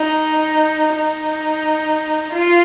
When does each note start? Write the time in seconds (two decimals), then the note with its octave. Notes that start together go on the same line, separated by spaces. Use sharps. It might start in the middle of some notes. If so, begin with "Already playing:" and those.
Already playing: D#4
0.96 D#4
2.33 F4